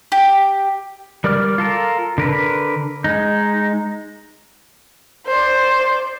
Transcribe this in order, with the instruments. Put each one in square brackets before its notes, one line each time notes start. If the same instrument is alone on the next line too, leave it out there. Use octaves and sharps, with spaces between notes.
[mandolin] G4
[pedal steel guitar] G3 A#4 D5 D6 F6
F4 A4 A#4
D3 A#4 B4
G#3 D#4
[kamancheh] C5 D5